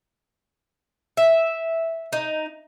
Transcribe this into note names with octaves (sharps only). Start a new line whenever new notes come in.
E5
D#4